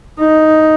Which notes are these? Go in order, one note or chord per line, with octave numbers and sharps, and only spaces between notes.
D#4